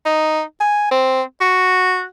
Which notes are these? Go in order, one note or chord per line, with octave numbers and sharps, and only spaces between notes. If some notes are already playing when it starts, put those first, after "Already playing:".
D#4
G#5
C4
F#4